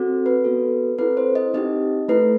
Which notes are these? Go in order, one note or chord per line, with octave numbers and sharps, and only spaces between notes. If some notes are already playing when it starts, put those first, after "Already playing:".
Already playing: C4 F#4 A4
B4
B3 F#4 A4
C4 E4 A4 B4
C5
D#5
C4 D#4 G4 D#5
A3 E4 A4 B4